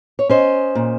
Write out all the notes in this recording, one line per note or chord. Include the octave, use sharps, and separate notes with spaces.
C#5
C#4 C5 D#5
A#2